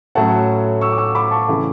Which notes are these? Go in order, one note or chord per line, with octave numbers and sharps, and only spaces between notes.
A2 F#3 A3 C#4 F#5 A5
C#6 E6
D6
C#6 E6
B5 D6
A5 C#6
C#3 E3 A3